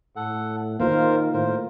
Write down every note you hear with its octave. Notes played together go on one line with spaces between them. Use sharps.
A2 A4 F#5
D#3 A#3 F4 A#4 C5 F5
A2 A#4 C5